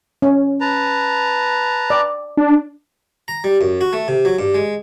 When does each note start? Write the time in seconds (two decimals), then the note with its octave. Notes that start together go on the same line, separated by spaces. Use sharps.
0.22 C#4
0.61 B4 A5 A#5
1.90 D5
2.37 D4
3.28 A#5
3.44 G3
3.61 F#2
3.81 F#4
3.93 A3
4.08 C3
4.25 F#3
4.39 G2
4.54 G#3